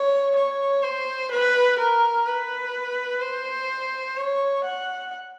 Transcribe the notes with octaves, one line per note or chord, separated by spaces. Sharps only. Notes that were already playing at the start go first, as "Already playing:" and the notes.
Already playing: C#5
C#5
C5
B4
A#4
B4
C5
C#5
F#5